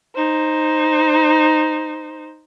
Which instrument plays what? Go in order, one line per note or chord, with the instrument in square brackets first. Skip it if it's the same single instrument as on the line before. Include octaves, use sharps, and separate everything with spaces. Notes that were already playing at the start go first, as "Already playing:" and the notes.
[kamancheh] D#4 C5